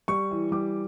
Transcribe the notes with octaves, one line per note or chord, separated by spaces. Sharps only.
G3 C#6
E3
G3 D6